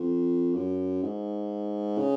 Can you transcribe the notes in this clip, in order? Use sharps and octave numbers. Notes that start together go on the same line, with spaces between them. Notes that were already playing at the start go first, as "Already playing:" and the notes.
Already playing: F2
F#2
G#2
C#3